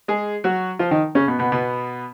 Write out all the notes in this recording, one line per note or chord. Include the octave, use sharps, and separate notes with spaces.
G#3 G#4
F#3 F#4
F3 F4
D#3 D#4
C#3 C#4
B2 B3
B2 B3
B2 B3